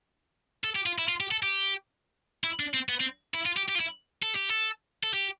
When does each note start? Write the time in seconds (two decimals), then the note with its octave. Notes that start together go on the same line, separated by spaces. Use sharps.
0.64 A4
0.75 G4
0.86 F4
0.98 E4
1.09 F4
1.20 G4
1.31 A4
1.43 G4
2.44 E4
2.60 D4
2.74 C4
2.89 B3
3.00 C4
3.34 E4
3.45 F4
3.57 G4
3.68 G4
3.75 F4
3.80 E4
4.23 A4
4.36 G4
4.50 A4
5.04 A4
5.14 G4